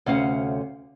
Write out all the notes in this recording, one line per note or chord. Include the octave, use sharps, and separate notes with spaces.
D2 C3 C#4 F5 F#5